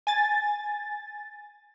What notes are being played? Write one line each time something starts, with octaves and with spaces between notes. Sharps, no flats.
G#5 A6